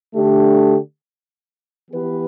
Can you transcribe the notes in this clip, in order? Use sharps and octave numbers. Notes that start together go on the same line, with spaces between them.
D3 A3 D4 G4
E3 B3 G4 B4